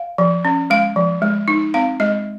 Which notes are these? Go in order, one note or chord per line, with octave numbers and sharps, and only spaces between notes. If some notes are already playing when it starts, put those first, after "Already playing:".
Already playing: F5
F3
C#4
G#3 F5
F3
G#3
D#4
C4 F5
G#3 D#5